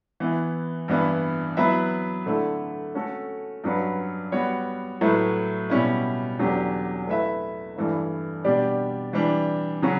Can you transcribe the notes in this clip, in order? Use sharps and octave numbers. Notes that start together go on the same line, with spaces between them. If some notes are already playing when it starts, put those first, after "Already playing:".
E3 B3 E4
G2 E3 B3 E4 B4
F#3 B3 E4 B4 E5
D3 A3 E4
A3 C#4 F#4 A4
G2 F#3 C#4 F#4 B4
G3 B3 F#4 C#5
A2 F#3 A3 E4 B4
B2 G3 C#4 E4
E2 D3 F#3 C#4 G4
A3 E4 B4 E5
G2 E3 A3 E4
B2 G3 D4 G4 D5
E3 G3 D4
C#3 F#3 C#4 F#4